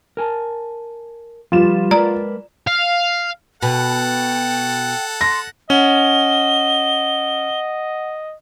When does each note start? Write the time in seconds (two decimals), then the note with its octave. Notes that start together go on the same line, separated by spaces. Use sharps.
0.17 A#4 G#5 A5
1.52 F3 G3 F4 B4 E7
1.91 G#3 A#4 B4 D5 A#5
2.67 F5
3.62 B2 A4 F#5 G5
5.21 C6 A#6
5.70 C#4 D#5 F#5 G7